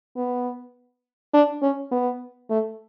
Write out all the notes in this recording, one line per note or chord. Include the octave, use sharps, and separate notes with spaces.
B3
D4
C#4
B3
A3